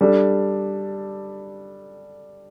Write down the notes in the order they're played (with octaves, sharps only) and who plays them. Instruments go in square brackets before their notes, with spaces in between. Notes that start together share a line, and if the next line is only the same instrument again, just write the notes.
[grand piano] G3 D4 A4